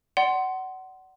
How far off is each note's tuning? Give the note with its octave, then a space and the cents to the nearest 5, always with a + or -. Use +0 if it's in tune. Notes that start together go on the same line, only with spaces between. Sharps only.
D5 +5 F#5 +20 C6 +0